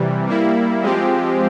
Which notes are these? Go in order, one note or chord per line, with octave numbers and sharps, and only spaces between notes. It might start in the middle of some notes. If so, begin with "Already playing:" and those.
Already playing: C3 E3 G3
G3 A#3 E4
F3 G#3 C4 G4